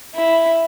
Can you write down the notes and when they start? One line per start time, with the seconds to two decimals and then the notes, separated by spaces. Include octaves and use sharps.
0.14 E4